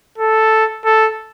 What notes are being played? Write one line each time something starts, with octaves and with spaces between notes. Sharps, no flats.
A4
A4